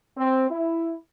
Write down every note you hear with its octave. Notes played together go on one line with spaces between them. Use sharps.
C4
E4